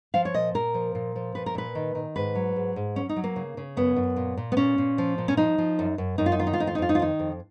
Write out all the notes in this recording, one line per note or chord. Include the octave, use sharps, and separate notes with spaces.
F3 F5
C#5
A#2 D#5
A#2 A#4
F3
A#2
F3
A#2 B4
A#4
A#2 B4
D#3
D#3
G#2 B4
F#3
G#2
G#2
F#3 C#4
D#4
F#3
A#3
C#3
C#3
F#2 B3
F#2
A#2
A#2
B3
A#2 C#4
A#2
F3
A#2
C#4
F3 D#4
F3
F#2
F#2
F#2 D#4
F4
D#4
D#3 F4
D#4
F4
F2 D#4
F4
D#4
F2 F4
D#4
F4
D#3 D#4
F2